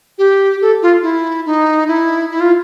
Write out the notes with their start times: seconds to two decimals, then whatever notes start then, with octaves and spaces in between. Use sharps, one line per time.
0.18 G4
0.61 A4
0.82 F4
1.03 E4
1.46 D#4
1.88 E4
2.31 E4
2.40 F4